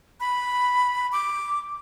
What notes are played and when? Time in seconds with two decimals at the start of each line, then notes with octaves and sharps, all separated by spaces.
0.20 B5
1.12 D6